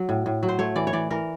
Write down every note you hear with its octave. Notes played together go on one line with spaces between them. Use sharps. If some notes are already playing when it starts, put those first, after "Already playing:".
Already playing: F#3
A2
A2
F#3
C5
A3 C#5
E3 D5
C#5
E3 D5
E3 A#4